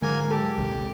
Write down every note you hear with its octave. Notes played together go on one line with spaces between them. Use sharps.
G#2 D3 F#3 A#3 A#4 G#5
G4 A4
A#1 D#2 C3